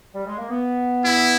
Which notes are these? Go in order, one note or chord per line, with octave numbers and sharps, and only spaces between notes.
G3
G#3
A#3
B3
E4